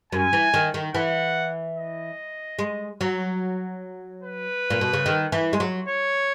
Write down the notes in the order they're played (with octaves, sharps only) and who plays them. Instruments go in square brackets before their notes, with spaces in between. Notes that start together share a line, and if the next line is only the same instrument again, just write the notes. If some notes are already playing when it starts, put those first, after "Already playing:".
[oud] F#2 [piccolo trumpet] G#5
[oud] E3
D#3
D#3
[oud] E3 [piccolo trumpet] F#5
[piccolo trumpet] D#5
[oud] G#3
F#3
[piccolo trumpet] B4
[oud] A#2
B2
C#3
D#3
E3
G#3
F#3
[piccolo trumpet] C#5